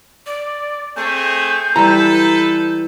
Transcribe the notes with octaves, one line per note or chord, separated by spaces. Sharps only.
D5
A3 C4 G#4 G6
E3 G3 A4 B4 A#5